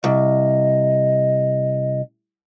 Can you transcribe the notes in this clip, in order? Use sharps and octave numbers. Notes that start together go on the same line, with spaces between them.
C2 D#5